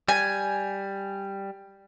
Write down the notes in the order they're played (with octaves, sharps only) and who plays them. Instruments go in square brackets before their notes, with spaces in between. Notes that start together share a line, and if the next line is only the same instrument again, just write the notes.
[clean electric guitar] G3 [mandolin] G#5